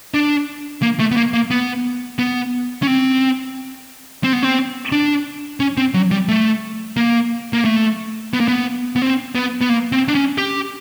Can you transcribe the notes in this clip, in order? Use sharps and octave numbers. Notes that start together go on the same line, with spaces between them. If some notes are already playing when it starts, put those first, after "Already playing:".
D4
A#3
A3
B3
A#3
A#3
B3
B3
C#4
C4
C4
B3
C4
D4
C#4
C4
F#3
G3
A3
A#3
A#3
A3
B3
A#3
B3
B3
C4
B3
B3
A#3
C4
D4
C#4
G4